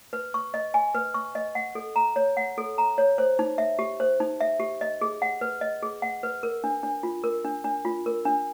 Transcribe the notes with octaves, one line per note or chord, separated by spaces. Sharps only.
B4
C#6
D#5
G#5
B4
C#6
D#5
F#5
A4
A#5
C#5
F#5
A4
A#5
C#5
C5
D#4
E5
G4
C5
D#4
E5
G4
D#5
G#4
F#5
B4
D#5
G#4
F#5
B4
A#4
D4
D4
F4
A#4
D4
D4
F4
A#4
D4